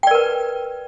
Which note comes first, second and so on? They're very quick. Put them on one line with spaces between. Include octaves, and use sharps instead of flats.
G5 D5 A#4 B4